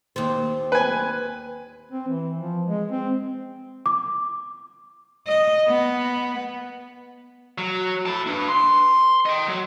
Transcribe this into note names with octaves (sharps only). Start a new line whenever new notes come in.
D#2 C4
B4 G#5
C4
E3
F3
G#3
C4
D6
D#5
B3
F#3
E4 A5
D4 B4
C6
D#5 G5
F#3